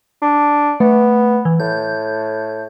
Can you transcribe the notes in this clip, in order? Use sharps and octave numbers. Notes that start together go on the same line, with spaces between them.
D4
A3 B3
E3
A2 G6